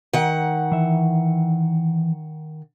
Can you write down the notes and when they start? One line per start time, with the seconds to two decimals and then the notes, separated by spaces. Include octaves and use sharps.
0.13 D#3 F#5
0.72 E3 E5